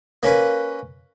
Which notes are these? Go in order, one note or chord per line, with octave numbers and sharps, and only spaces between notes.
A#3 C#4 B4